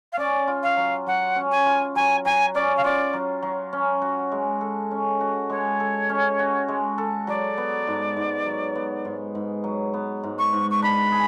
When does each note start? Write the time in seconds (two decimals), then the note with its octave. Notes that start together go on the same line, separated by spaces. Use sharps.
0.12 F5
0.17 C#4 D5
0.47 F4
0.62 F5
0.77 F#3
1.06 F#3 F#5
1.36 C#4
1.51 G#5
1.66 F4
1.95 F#3 G#5
2.25 F#3 G#5
2.54 C#4 D5
2.76 F5
2.84 F4 D5
3.13 F#3
3.42 F#3
3.73 C#4
4.02 F#4
4.32 G#3
4.61 A4
4.91 C#4
5.21 F#4
5.50 G#3 C#5
5.80 A4
6.09 C#4
6.39 F#4
6.68 G#3
6.98 A4
7.27 F#3 D5
7.58 B3
7.87 G#2
8.16 G#2
8.46 F#3
8.75 B3
9.05 G#2
9.35 G#2
9.64 F#3
9.94 B3
10.23 G#2
10.38 C#6
10.53 G#2
10.70 C#6
10.82 D4 B5
11.12 G#4